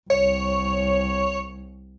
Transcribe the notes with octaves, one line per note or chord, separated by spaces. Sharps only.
C2 C#5